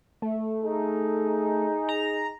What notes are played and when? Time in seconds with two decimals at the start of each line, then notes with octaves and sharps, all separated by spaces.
0.22 A3
0.63 D#4 G#4
1.89 A#5